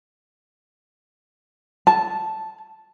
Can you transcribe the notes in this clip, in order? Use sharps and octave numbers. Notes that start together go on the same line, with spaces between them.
A5